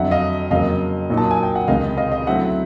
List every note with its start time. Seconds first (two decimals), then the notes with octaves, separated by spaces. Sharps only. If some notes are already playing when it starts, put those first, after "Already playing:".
Already playing: F2 D3 F#3 E5 F#5
0.11 D#5 F5
0.51 F2 C#3 F#3 A#3 D#5 F5
1.10 A#2 F#3 A#3 D#4
1.17 A5
1.31 G#5
1.43 G5
1.55 F#5
1.68 C#2 C3 D#3 D#5 F5
1.97 D#5 F5
2.12 D#5 F5
2.27 D3 F#3 A3 C4 E4 E5 F#5